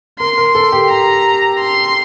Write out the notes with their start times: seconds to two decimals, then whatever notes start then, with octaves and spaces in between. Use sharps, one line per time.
0.20 A#4 C6
0.38 A#4
0.55 A4
0.72 G4
0.90 A#5
1.60 C6